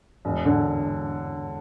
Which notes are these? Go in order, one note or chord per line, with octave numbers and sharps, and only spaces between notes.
E1
D3